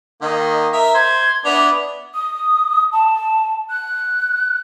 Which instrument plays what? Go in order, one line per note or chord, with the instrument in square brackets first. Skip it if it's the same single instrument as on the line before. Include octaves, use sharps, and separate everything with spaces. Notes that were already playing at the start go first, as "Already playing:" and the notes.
[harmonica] D#3 A#3 [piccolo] D#5
[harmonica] A#4 E5
[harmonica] C5 [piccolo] G#6
[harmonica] B3 D4 E4 [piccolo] F7
[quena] D#6
A5
F#6